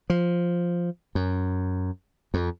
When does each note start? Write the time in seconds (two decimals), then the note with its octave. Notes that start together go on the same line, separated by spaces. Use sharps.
0.10 F3
1.15 F#2
2.34 F2